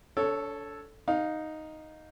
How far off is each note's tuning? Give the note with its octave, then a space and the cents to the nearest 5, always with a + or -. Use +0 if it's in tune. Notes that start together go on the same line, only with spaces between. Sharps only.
D4 -35 A4 +0 C#5 +0
D#4 +0 F5 +25